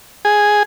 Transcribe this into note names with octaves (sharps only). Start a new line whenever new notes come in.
G#4